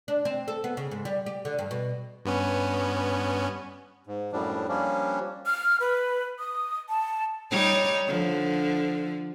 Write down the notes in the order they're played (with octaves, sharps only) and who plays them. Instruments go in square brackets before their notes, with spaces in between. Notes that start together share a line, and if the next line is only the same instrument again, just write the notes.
[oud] D4
C4
A4
B3
C#3
G#2
G3
G4
D3
G2
B2
[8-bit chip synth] G2 B3 C#4
[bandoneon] G#2
F#2 A2 F3 G3 D4
F3 G3 A#3 C#4 D4
[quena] F6
B4
D#6
A5
[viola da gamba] G3 D#4 C#5
D3 F3